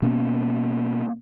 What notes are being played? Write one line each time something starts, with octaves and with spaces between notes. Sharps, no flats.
B2 A#3 B3 C#4